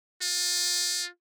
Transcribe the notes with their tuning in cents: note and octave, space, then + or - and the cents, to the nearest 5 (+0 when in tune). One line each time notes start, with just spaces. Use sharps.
F4 +25